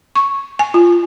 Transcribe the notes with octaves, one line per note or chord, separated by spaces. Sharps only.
C#6
G#5
F4